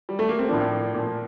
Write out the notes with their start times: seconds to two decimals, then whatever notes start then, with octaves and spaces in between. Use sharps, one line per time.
0.09 G3
0.19 A3
0.29 A#3
0.39 C4
0.49 A2 F3 A#3 D4
0.94 A#2 F3